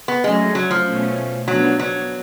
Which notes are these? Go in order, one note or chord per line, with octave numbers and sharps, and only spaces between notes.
B3
F#3 G#3 A3 C#4
F#3
F3
B2 A3 C#4
F3 F#3 B3 D4
F#3